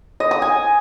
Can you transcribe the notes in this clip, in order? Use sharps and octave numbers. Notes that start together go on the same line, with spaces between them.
D#5
D#6
G#5